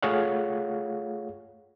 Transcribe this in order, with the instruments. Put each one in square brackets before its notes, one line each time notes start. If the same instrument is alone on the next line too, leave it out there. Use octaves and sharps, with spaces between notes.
[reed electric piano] A3 F4 G#4 C#5 F5 F#5